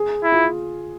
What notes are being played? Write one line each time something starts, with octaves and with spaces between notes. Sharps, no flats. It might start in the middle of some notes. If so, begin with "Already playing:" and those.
Already playing: G#4
E4
F4